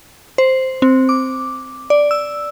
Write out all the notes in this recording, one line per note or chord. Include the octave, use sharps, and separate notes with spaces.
C5
C4
D6
D5
E6